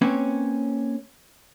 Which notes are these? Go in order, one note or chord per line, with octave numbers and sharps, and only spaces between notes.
A#3 C4 C#4 B4 C#5